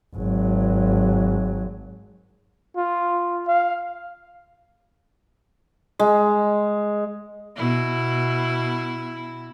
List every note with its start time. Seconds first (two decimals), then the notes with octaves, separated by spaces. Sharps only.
0.16 G#1 F#3
2.77 F4
3.48 F5
5.99 G#3
7.56 B2 E4